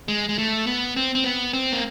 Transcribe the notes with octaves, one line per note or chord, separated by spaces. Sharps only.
G#3
G#3
A3
B3
C4
C4
B3
C4
A#3